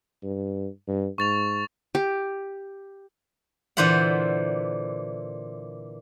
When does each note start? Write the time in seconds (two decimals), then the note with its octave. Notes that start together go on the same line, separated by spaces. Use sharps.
0.23 G2
0.88 G2
1.18 G#2 C#6 A6 F7
1.95 G4
3.77 A#2 D3 E3 C5 E5 F#5